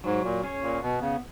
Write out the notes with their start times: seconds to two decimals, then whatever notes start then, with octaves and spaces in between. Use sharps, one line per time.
0.04 G#2 F#3
0.24 A#2
0.43 C#4 G#4 C#5
0.63 A#2
0.82 B2 B3
1.02 C#3